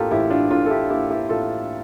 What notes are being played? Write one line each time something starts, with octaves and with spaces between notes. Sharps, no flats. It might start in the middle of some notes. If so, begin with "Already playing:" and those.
Already playing: A2 A#3 F4 G4 A4 A#4
A1 E4 G4
D4 F4
A2 D4 F4
A4
E4 G4
A#3 E4 G4
E4 G4
A2 F4 A4